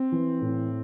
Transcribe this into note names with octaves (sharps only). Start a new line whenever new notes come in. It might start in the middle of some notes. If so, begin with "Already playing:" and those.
Already playing: C4
E3
A2